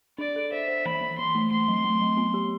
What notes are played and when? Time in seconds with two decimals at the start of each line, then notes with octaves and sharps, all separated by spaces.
0.18 D4 D5
0.36 A4
0.52 C5 E5
0.68 C5
0.86 E3 B5
1.01 E3
1.18 E3 C6
1.35 A3
1.51 A3 C6
1.68 F#3
1.85 A3
2.01 F#3
2.17 B3
2.34 G4